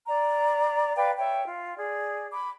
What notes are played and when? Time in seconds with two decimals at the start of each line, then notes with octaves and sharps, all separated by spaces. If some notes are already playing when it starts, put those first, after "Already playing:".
0.07 D5 A#5
0.96 B4 D5 F5 G5
1.18 C#5 E5 G5
1.46 F4
1.77 G#4 D5
2.31 B5 D6